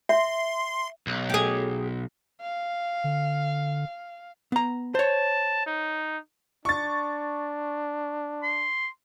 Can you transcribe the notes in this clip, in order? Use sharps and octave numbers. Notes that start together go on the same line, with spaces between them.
E5 C6
B1
G4 G#4
F5
D3
B3 A#5
C5 C#5 A5
D#4
D4 C#6 A6
C6